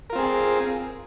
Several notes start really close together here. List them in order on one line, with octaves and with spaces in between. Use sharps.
A#4 F4 C4 G#4